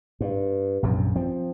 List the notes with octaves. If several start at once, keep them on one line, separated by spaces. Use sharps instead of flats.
G2
A#1 F#2 C3
F3 C4